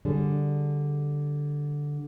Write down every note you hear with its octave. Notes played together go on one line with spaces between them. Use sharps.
D3 G3 D4 G#4